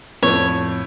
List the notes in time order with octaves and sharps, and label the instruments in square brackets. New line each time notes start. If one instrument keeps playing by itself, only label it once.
[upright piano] F2 A2 [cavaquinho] C#5